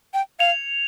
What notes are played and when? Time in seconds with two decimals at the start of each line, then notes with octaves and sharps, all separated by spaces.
0.14 G5
0.39 F5 G#6 C#7 F7